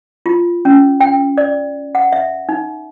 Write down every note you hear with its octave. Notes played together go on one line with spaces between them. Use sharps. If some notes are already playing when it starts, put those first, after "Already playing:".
F4
C#4
G5
D5
F#5
E5
D#4